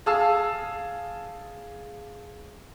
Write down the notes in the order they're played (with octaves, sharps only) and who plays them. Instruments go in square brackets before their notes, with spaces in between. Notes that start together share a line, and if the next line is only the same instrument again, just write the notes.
[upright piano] G#4 F5 A5 E6